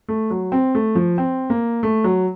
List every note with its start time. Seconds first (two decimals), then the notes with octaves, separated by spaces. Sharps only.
0.09 A3
0.30 F#3
0.52 C4
0.75 A3
0.95 F3
1.18 C4
1.50 A#3
1.83 A3
2.04 F#3